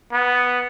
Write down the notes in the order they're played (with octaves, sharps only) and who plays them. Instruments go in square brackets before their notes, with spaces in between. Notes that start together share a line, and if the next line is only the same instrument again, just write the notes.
[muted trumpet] B3